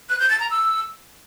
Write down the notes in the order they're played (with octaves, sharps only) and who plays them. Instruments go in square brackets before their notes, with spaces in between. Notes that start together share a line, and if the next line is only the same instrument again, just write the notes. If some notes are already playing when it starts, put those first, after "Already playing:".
[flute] F#6
G6
A6
A#5
E6